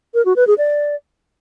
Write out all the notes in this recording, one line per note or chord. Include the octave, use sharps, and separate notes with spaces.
A#4
F#4
B4
G#4
D5